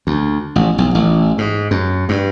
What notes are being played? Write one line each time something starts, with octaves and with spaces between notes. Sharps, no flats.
D2
A1
B1
A1
G#2
F#2
G2